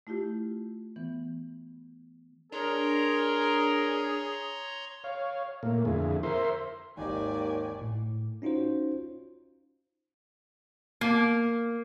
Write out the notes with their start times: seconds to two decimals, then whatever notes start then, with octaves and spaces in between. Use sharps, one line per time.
0.07 A3 E4 F4 G4
0.96 E3 B3
2.52 D4 G#4 A#4 C#5 A#5 C6
5.04 C#5 F5
5.63 A#2 A3 A#3
5.85 F2 D3 E4 F4 G#4
6.23 A#4 C5 E5 C6
6.97 G#1 D#2 G4 D5 D#5 G#5
7.81 A2
8.42 C#4 D#4 F4 F#4 C5
11.01 A#3